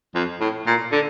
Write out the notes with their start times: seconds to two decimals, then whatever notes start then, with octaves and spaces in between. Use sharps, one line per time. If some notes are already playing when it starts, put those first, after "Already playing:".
0.15 F2
0.41 A2
0.67 A#2
0.92 D3